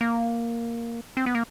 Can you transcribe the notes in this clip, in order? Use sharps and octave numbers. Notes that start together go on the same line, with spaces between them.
A#3
C4
B3
A#3